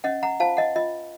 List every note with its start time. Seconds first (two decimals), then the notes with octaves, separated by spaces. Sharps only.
0.04 C#4 D#5 F#5
0.23 F#5 A#5
0.40 F4 C5 F5 A5
0.57 D#5 F#5
0.76 F4 D#5